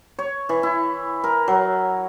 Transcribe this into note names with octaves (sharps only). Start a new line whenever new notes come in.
C#5
E3
E4
A#4
F#3